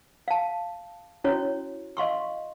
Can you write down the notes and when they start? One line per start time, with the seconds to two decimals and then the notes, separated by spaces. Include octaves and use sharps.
0.28 F5 A5
1.24 C#4 E4 F#4 C#5
1.97 D#5 F5 C6 C#6